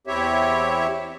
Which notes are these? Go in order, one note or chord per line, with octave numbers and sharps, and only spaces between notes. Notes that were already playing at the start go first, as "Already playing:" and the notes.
E2 C4 E4 G4 C#5 E5